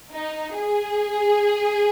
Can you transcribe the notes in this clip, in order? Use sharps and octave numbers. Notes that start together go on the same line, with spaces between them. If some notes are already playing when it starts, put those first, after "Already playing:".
D#4
G#4